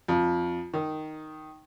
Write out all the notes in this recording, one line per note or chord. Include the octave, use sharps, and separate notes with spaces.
F2
D#3